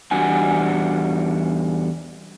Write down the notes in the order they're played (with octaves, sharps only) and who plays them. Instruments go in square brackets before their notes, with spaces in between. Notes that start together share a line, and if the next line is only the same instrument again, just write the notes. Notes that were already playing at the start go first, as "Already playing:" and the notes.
[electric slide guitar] E2 G3 D4 F#4 G#5